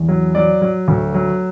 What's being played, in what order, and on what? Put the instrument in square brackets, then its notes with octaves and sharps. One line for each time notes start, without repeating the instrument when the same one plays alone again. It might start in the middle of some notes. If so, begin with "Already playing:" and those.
Already playing: [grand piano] E2
F#3
F#3 D5
F#3
D2
F#3